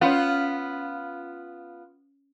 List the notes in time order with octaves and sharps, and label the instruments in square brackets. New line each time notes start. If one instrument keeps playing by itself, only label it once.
[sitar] B3 F4 [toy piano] C#4 C#5